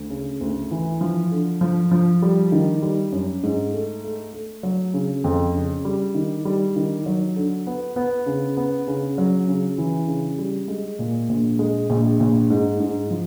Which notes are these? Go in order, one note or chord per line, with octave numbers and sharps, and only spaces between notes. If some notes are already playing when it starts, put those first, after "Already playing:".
Already playing: D2
C#3
D2
E3
F3
D3
F3
F3
G3
D#3
G3
F#2
G#2
A3
A3
A3
F#3
C#3
F2
C#3
G3
D#3
G3
D#3
F#3
D3
B3
B3
C#3
B3
C#3
F#3
C#3
E3
C#3
G3
G#3
A#2
A#1
G#3
A#1
A#1
G#2
G#2
F3